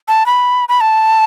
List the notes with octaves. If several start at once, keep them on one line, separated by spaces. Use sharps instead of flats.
A5
B5
B5
A5